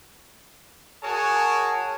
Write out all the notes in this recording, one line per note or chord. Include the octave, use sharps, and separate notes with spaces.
F#4 G#4 A#4 C#5 G#5 A5